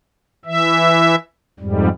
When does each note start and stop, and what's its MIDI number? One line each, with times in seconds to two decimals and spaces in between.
0.45 1.15 52
0.45 1.15 76
1.60 1.89 41
1.60 1.89 44
1.60 1.89 55